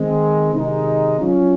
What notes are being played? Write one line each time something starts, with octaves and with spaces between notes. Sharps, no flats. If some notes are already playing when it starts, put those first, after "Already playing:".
Already playing: D#3 G#3 C4
C3 D#3 G#3 D#4
F#3 C#4 F4